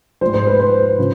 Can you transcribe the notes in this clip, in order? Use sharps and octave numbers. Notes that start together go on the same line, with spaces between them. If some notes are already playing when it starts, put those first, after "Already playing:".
G#2 F3 C5
C5
B4
C5
C#3 F3